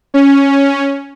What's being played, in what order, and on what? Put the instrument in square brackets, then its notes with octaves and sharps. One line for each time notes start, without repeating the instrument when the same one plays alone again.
[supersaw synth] C#4